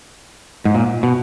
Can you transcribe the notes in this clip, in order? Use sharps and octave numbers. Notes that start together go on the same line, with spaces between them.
G#2
A#2
B2